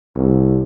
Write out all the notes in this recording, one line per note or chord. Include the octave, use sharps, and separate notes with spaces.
C2